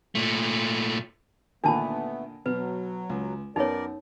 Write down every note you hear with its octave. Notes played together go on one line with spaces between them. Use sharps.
A#2 A3
A#2 D3 D#3 A3 B3 D4 A5 B5
B2 F#3 B4
C#2
F#2 B3 D#4 A#4 C#5 D5